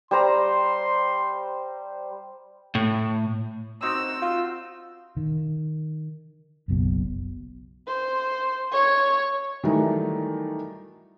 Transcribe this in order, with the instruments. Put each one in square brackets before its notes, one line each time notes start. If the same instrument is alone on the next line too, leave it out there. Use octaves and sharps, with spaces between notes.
[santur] G3 C5 A#5 [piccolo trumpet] C6
[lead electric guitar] A2
[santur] C4 D#4 F#4 [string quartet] E6
[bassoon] F4
[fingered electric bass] D#3
F#1 B1 B2
[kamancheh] C5
C#5 C#6
[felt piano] D#3 E3 F#3 G3 A3 D#4